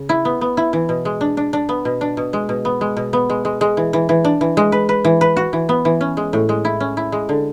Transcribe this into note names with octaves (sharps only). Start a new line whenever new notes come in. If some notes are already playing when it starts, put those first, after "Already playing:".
Already playing: C#3
E4
B3
B3
E4
E3
B2
G#3
D4
D4
D4
B3
B2
D4
B2
G#3
B2
B3
G#3
B2
B3
G#3
G#3
G#3
E3
E3
E3
D4
E3
G#3
B4
B4
E3
B4
F#4
E3
B3
E3
C#4
G#3
A2
G#3
E4
C#4
E4
G#3
D3